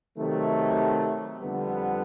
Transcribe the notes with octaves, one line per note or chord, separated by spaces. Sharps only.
C3 D#3 F#3 A3
F2 D3 G3 B3